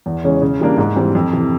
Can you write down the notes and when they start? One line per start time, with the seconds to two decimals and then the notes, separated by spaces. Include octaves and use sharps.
0.06 E2
0.24 C#3 E3 G#3 C#4
0.42 C#3
0.59 E3 G3 A#3 D4
0.78 G#2
0.96 E3 G3 C4
1.15 F2
1.33 C3 E3